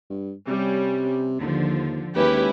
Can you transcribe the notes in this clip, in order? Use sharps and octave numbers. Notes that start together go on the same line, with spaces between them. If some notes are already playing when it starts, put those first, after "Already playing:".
G2
C3 G3 C#4
D#2 D3 F3
D#2 G#3 C#4 E4 G4 B4